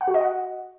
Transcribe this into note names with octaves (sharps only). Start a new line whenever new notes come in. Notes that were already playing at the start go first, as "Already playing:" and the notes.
F#5
F#4
D#5
F#5